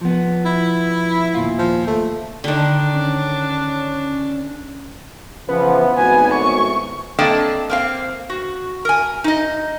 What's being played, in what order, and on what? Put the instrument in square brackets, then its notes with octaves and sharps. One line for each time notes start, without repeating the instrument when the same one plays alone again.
[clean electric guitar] F3 B3
[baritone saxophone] E4
[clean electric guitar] D#2 A#2 F4
[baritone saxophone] F3
A3
[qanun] D3 D#3 [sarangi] D4
[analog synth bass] C#4
[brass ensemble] C#3 E3 F3 [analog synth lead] B3
[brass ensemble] G#1 F2 A2 [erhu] G#5
[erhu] C#6
[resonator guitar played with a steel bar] A#3 C4 D4 A4 D#5 G5
A#3 C4 F5
F#4
A#4 G#5
D#4 D#5